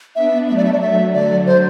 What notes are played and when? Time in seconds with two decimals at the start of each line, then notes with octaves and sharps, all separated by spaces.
0.15 B3 D4 E5
0.48 F#3 A3 E5
0.57 D5
0.65 E5
0.73 D5
0.81 E5
1.13 D3 F#3 D5
1.46 C5